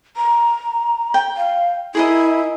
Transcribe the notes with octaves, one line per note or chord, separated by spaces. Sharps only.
A#5
G5
F5
E4 G#4 A#4 D#5